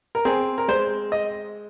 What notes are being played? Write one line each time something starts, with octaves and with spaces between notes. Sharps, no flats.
A#4
C4 G#4
A#4
G#3 C5
D#5